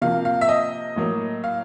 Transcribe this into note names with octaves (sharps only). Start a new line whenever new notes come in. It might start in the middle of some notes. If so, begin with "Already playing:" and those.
C3 F3 A#3 F5
F5
E5
D#5
A2 F#3 A#3
F5